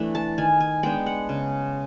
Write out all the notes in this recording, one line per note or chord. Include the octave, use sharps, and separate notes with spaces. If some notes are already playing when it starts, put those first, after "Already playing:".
Already playing: E3 A3 D4
A5
D#3 G#5
G#5
G#3 B3 D4 G5
F#5
C#3